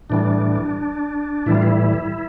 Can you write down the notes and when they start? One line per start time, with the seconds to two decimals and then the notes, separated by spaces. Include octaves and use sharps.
0.10 A2 E3 G3 D4
1.46 A2 E3 G3 E4
1.55 F4
1.62 E4